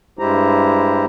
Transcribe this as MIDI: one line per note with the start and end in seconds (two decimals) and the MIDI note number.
0.19 1.06 43
0.19 1.06 56
0.19 1.06 64
0.19 1.06 67
0.19 1.06 72
0.19 1.06 82